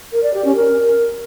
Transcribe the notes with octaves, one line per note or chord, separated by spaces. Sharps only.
A#4
D5
G4
C#4
A#4